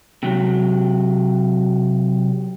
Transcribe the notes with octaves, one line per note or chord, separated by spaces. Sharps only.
C3 F#3